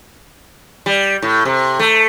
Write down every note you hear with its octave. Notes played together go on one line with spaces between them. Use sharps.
G3
A2
C3
A3